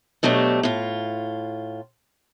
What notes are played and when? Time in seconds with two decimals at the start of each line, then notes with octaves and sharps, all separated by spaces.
0.23 B2 F#3 A3 D4 G4
0.63 A2 F4